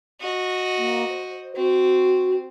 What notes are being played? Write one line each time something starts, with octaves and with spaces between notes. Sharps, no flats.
F#4 D#5
A#3
C5
C4 F#4